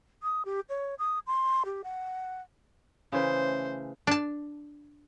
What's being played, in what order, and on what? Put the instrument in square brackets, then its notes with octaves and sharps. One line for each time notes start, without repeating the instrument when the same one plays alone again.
[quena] D#6
G4
C#5
D#6
C6
G4
F#5
[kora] C#3 E3 A3 [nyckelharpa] C5
[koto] D4 A5